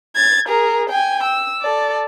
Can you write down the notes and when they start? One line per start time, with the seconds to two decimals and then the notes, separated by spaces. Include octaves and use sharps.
0.16 G#6 A6
0.48 G#4 A#4
0.89 G5 G#5
1.23 E6
1.61 A4 D5